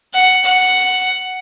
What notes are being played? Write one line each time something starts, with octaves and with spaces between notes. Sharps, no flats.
F#5
F#5